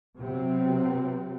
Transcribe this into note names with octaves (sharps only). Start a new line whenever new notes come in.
C3 F#3 B3 C4